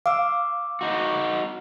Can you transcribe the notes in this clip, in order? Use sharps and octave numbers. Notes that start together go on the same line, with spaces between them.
F5 D6 E6
D#4 F#4